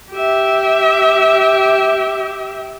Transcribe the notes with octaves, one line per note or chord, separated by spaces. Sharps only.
G4 E5